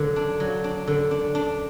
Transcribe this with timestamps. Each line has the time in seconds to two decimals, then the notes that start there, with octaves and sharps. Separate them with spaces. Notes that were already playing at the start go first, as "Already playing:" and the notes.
Already playing: D3 F#3
0.16 D4
0.40 F#3
0.64 D4
0.87 D3
1.11 D4
1.35 D4